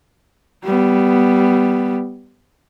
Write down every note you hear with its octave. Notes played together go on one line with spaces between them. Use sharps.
G3 B3